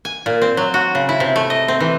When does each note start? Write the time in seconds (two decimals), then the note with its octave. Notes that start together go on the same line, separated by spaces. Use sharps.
0.05 G#5
0.26 A#2
0.42 C4
0.57 F#3
0.74 F#4
0.95 C#3
1.09 E4
1.20 C3
1.36 A3
1.50 D#5
1.68 C4
1.80 E3